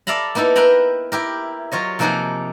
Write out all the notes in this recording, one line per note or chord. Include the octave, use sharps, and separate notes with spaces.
A4 D5 E5 F5 A#5 B5
A#3 B3 D#4 E4 A4
A#4 B4 E5 G5 A#5 B5
E4 G4 A#4
F#3 F4 C#5 D#5
C3 F3 A#3 D#4 G#4 F#5